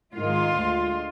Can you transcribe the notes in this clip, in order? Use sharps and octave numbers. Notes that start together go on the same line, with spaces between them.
G#2 D#3 G#3 F4
D2 D3 G#3